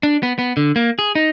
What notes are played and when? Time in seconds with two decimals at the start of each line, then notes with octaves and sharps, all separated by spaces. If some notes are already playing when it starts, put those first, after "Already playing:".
0.03 D4
0.23 B3
0.39 B3
0.57 D3
0.76 A#3
0.99 G#4
1.15 D#4